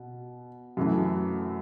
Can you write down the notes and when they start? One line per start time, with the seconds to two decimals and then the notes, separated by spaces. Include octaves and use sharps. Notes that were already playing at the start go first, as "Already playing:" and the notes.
Already playing: B2
0.77 F#2 E3 A3